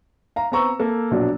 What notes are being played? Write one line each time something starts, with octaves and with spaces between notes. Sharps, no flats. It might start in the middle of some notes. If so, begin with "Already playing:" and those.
F5 A#5
B3 C4 A#5 C#6 E6
A#3 A4
A#1 B2 F#3 D4